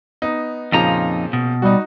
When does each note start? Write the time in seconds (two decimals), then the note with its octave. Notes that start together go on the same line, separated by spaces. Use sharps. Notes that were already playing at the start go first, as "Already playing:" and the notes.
0.22 B3 D#4
0.72 F2 A#2 C#3 F3 D#4 A#5
1.33 B2
1.62 G3 D#4 F#4